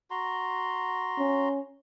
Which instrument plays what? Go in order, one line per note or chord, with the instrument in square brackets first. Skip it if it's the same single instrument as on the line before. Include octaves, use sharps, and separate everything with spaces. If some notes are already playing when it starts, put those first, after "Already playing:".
[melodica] F#4 A#5 C6
[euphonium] C#4